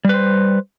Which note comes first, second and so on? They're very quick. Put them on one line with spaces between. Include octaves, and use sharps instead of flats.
G3 B4 C5